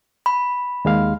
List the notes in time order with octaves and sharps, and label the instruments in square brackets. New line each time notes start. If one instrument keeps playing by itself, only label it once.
[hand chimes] B5
[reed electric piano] D#2 G#3 F5